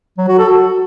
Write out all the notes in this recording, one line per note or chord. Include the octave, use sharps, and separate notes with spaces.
F#3
F#4
A4
F#4